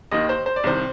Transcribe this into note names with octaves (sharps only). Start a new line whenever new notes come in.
D#2 D#3 D#5
C5
C5
D5
C2 C3 D#3 C5